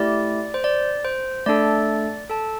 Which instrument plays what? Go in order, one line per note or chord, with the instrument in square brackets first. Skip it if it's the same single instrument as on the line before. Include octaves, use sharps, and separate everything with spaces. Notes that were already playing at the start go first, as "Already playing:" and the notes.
Already playing: [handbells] A3 E4 G4 D5
C5
D5
C5
A3 D4 A4 D5
A4 A5